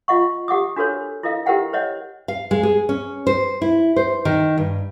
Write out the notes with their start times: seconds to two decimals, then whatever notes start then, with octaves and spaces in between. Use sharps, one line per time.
0.08 F4 D#5 F#5 C#6
0.48 G4 F#5 D6 D#6
0.76 D4 F#4 A4 A#4 C5 C#5
1.23 E4 A4 A#4 D#5 F5
1.46 E4 G4 A#4 C5 F#5 G5
1.73 C5 C#5 D#5 F#5
2.28 F5
2.51 G#3
2.63 G#4
2.89 C#4
3.27 C5
3.62 E4
3.96 C5
4.25 D#3
4.58 G2